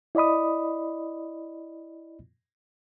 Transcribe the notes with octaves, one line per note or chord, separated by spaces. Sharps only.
E4 D5 D#5 B5 D#6